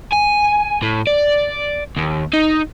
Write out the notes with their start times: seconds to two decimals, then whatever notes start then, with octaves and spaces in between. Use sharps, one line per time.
0.13 G#5
0.82 A2
1.07 D5
1.96 D#2
2.33 D#4